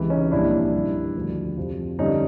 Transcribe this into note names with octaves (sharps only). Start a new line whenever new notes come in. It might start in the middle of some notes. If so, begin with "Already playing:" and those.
Already playing: C#2 C3 E3
C#4 D#4
C2 A#2 F3 D4 E4
G2 D#3
D2 D3 F3
F2 C3 F3
G2 D3 F3 C#4 D#4